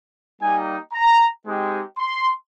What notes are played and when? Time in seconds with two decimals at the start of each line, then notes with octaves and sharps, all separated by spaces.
0.40 G3 A#3 D#4 G4 G#5
0.93 A#5
1.45 G#3 C4 D#4 G4
1.97 C6